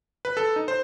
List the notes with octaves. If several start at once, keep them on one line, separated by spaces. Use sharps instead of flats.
B4
A4
D#4
C5